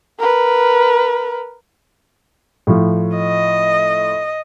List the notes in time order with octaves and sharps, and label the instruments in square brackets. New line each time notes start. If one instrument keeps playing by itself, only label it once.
[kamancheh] A#4 B4
[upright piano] A2 F3
[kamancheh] D#5